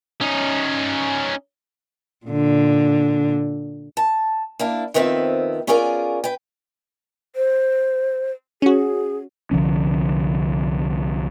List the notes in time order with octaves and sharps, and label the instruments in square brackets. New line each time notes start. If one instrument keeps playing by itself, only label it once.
[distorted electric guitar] C#4 D#4
[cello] A#2 D3
[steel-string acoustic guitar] A5
A#3 D4 E4
F2 D#3 B3 C4 F#4 E5
B3 C#4 F4 G#4 A#4 D5
B4 G5
[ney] C5
[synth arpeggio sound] C#4 F#4 [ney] G#4
[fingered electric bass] C2 D3 F3 C#4